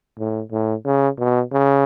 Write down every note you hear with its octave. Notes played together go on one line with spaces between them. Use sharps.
A2
A2
C#3
B2
C#3